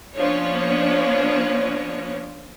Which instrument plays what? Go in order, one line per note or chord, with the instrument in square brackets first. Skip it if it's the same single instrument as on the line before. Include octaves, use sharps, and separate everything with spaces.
[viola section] F3 A#3 B3 C#4 D4 C#5